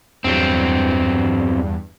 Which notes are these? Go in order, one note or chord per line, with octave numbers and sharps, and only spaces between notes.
E2 G2 F#3 C4